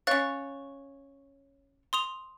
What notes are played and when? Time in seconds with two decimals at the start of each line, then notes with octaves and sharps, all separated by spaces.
0.07 C#4 C#5 F5 F#6 A6
1.93 C6 D#6 F7